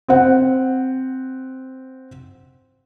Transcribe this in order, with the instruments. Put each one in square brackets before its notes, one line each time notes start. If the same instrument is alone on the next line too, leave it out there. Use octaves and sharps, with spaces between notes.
[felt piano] C4 F#5